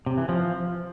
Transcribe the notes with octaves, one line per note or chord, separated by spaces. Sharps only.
C3
E3
F3